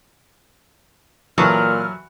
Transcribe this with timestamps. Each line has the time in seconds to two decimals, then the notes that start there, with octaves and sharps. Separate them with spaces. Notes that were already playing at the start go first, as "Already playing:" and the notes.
1.38 A#2 E3 F#3 A4 D#6 F6